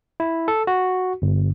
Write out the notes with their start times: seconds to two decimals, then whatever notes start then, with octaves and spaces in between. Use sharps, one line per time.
0.20 E4
0.48 A4
0.67 F#4
1.22 G1